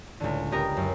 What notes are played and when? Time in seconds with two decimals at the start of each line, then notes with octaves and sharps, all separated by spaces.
0.20 C#2 A2 D3
0.52 B3 G4 A#4 D#5 G5 A#5
0.77 F#2